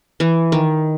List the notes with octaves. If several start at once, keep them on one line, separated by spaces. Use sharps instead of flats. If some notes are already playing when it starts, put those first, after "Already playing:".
E3
D#3